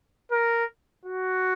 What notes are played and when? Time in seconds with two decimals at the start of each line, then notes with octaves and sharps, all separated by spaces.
0.31 A#4
1.05 F#4